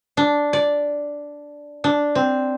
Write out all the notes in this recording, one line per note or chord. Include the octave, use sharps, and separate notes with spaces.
D4
D5
D4
C4